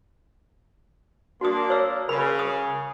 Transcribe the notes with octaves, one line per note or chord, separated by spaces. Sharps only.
A#3 D4 F#4 D#6
C#5 E6
C#3 A#4 B5
D#6